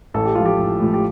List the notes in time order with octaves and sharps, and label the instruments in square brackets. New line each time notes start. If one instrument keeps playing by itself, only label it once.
[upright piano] A1 A4
G4
A2 F3 F4
G4
A1
A2 F3
G4